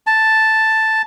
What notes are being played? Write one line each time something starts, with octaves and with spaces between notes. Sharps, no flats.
A5